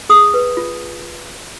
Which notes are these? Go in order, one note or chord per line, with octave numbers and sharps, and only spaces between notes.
G#4 D#6
B4
F4